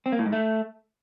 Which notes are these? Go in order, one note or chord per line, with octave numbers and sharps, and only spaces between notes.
C4
A#3
A2
G#2
A3